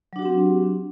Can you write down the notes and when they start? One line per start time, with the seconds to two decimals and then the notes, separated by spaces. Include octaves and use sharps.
0.13 F#3
0.16 D4
0.19 F#4
0.22 G4
0.25 C4